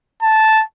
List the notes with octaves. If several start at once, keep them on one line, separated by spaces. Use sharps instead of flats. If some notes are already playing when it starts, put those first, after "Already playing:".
A5